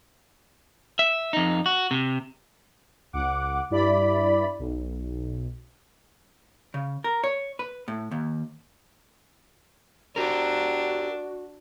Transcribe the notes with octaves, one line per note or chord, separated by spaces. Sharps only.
E5
F2 D#4
F#4
C3
C#2 F#5 D6
G2 E4 D5 B5
B1
C#3
A#4
C#5
B4
A2
D#2
D4 F#4 G4 A#4